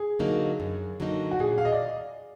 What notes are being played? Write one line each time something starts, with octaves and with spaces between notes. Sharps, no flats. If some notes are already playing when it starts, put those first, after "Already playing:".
Already playing: G#4
D3 F#3 A#3 D#4
F#2
D3 F#3 A#3 D#4
F#4
A#2 G#4
F5
D#5
D5